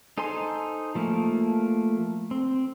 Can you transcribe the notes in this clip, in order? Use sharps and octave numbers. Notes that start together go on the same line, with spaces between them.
D#4 A4 C5 G#5 C6
F3 A3 A#3
C4